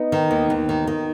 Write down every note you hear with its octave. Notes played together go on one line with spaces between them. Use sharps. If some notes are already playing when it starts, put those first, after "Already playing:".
Already playing: B3 D#4
D#3
D#2
D#2
D#3
D#3